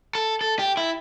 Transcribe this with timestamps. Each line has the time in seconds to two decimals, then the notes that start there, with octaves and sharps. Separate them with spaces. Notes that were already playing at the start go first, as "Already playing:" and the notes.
0.15 A4
0.41 A4
0.59 G4
0.77 E4